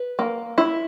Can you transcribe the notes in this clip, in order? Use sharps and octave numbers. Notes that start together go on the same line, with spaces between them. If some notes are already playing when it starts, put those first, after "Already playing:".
Already playing: B4
A#3
E4